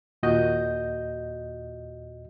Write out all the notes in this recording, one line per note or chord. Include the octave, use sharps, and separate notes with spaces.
D#2 A#2 F#4 D#5 G6